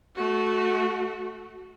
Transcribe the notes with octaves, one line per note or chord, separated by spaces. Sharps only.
A3 F#4